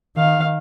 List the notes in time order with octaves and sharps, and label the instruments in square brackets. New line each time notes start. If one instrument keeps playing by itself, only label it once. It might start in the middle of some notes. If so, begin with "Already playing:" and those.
[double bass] D#3 [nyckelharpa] F5